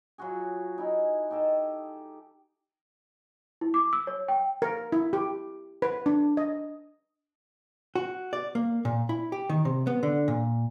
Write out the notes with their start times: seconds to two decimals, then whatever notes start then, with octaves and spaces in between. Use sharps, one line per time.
0.18 F#3 F4 F#4 G#4
0.78 D#4 E4 G#4
1.31 D#4 G4 A4 D#5
3.61 E4
3.74 D6
3.93 E6
4.07 C#5
4.28 G5
4.62 A#4
4.92 E4
5.13 G4
5.82 B4
6.06 D4
6.37 D#5
7.95 F#4
8.33 D5
8.55 A#3
8.85 A#2
9.09 E4
9.32 G4
9.50 D#3
9.65 C3
9.87 B3
10.03 D3
10.28 A#2